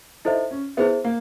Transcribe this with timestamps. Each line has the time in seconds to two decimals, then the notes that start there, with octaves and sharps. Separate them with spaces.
0.25 D#4 E4 A4 C5 E5
0.51 C#4
0.77 B3 E4 G#4 C5 E5
1.04 A#3